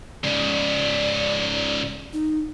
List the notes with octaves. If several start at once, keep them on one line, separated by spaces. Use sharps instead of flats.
G#2 C#3 D5
D#4